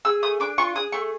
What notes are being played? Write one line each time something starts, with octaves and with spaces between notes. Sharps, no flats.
G#4 E6
A3 D#6
D4 D6
F4 C#6
G#4 D#6
A3 C#6